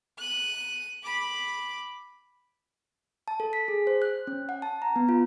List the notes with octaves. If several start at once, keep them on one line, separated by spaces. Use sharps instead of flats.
F#6 D#7
B5 D6
A5
A4
B6
G#4
C5
F#6
C#4
F#5
A5
A#5
B3
F4